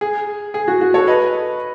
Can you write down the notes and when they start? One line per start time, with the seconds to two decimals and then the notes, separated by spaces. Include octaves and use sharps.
0.01 G#4
0.54 G#4
0.68 F#4
0.81 F#4
0.94 A4 C#5
1.07 B4 D#5